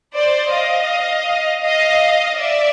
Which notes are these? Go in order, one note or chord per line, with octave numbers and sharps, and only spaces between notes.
C5 D5
D#5 F5
D#5 F5
D5 E5